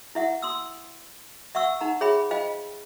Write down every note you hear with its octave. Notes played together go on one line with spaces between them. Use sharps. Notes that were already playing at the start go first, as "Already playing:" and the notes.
E4 E5 F#5
C6 D#6 E6
E5 F#5 C#6 E6
D#4 F#5 A#5
G#4 C#5 E5 G5 B5
F4 C5 D#5 F5 G5